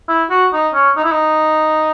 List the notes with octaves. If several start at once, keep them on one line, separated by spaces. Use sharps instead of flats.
E4
F#4
D#4
C#4
D#4
E4
D#4